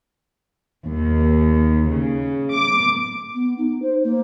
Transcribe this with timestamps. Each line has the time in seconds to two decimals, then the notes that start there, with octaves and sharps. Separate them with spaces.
0.86 D#2
1.89 C#3
2.53 D6
3.35 B3
3.58 D#4
3.82 C5
4.04 A#3